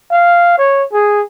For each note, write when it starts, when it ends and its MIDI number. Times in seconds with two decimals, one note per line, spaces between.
0.11 0.56 77
0.58 0.84 73
0.93 1.22 68